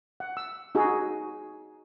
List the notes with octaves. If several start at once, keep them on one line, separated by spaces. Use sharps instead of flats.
F#5
E6
D#4 F#4 G#4